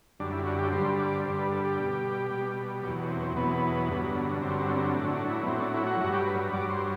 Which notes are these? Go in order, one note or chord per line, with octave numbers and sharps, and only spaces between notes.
F#2 D3 G3 D4
E4
F#4
G4
G2 D3 G3 C5
D5
G2 D3 G3 C5
B4
A4
G4
B2 G3
B2 G3
E2 B2 F#3 G4
C4
C4
E2 B2 F#3 B3
G2 D3 F#3
G2 D3 F#3 C4
C4
C4
A2 F#3 D4
D4
E4
B3
A2 F#3 C4
D4
E4
F#4
G2 F#3 F#4
G4
B4
G2 F#3 D5
C5